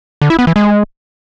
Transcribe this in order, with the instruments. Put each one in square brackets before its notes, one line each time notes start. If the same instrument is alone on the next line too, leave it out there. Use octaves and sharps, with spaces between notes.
[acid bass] D3
E4
B3
E3
G#3